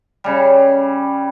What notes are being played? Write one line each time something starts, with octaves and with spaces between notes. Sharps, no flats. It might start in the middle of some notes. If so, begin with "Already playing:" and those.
C#3 G3